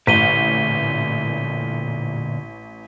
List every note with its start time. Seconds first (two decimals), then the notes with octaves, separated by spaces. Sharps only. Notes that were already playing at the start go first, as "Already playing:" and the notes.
0.07 A1 A#2 D3 B6 D#7 G7